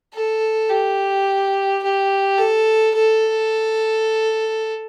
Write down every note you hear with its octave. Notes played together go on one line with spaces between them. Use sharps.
A4
G4
G4
A4
A4